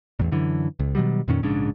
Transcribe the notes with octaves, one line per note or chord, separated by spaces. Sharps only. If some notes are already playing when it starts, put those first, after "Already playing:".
A1 E2 A#2
F#2 D3 E3
C#2
B2 D#3 F#3 G3
F2 A#2 D#3 C#4
A#1 G#2 C#3 D4